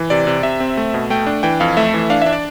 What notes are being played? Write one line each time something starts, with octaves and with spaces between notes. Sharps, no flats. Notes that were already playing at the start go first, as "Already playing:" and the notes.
Already playing: E3
C3 D5
C3
C3 E5
C4
A3
B2
A3 G5
D4
E3 G5
F2 F5
A3 E5
E3
D4 F5
D4 E5
D5